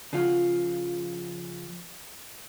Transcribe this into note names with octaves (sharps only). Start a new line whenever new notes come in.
C#3 F3 F4 F#4